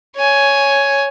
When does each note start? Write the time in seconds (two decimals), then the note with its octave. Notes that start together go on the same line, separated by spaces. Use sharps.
0.16 C#5 G#5